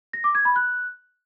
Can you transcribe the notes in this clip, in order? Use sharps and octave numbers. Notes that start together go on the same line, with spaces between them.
A#6
D6
G#6
B5
F#6